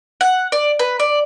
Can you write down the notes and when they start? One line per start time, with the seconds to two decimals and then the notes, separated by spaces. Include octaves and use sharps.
0.21 F#5
0.52 D5
0.79 B4
1.00 D5